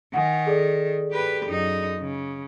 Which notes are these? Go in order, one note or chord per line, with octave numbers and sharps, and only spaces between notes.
D#3 F#5 G#5
G#4 A4 D5
G4 B4
F#2 D#4
C#3